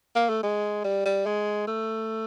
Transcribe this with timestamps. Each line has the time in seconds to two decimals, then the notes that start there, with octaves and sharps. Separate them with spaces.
0.16 A#3
0.30 A3
0.43 G#3
0.85 G3
1.06 G3
1.26 G#3
1.67 A3